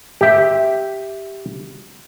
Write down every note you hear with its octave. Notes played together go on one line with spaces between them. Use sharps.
G4 E5